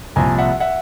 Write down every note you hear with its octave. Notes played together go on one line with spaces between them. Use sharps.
C2 A#2 F3 G#5 A#5
E5 F#5
E5 F#5